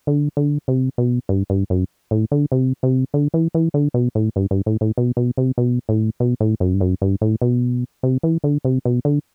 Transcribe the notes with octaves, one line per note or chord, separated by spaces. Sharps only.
D3
D3
C3
B2
G2
G2
F#2
A2
D3
C3
C3
D3
E3
E3
D3
B2
A2
G2
G2
A2
A2
B2
B2
C3
B2
A2
B2
A2
F#2
G2
F#2
G2
A2
B2
C3
E3
D3
C3
B2
D3